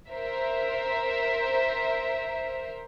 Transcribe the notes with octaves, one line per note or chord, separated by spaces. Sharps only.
A#4 C5 E5